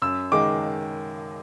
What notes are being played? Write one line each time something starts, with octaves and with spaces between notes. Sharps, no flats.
F#2 E6
D#3 G#3 D6